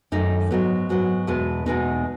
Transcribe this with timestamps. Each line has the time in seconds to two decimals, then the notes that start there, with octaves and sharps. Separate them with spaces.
0.12 F#2 D#3 A3 D#4
0.51 G#2 F#3 B3
0.89 G#2 F#3 B3
1.27 E2 B2 G#3 B3
1.66 E2 B2 G#3 B3 D#4